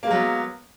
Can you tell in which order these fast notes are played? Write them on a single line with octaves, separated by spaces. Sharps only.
A#3 G#3 F#3 B3